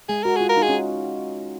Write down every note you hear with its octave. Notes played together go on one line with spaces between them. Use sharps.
G#3 G#4
F#4 A#4
F4 G#4
A#4
D#4
G#4
C#4